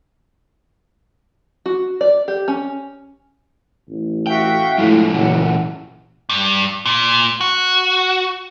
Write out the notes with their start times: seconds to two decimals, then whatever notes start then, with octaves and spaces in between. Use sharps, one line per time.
1.66 F#4
2.01 D5
2.28 G4
2.48 C#4
3.89 A1
4.27 F#4 E5 F5 G5
4.78 A2 D3 F3 G#3
5.14 F#1 A#2 E3 F#5
6.30 G2
6.86 A#2
7.41 F#4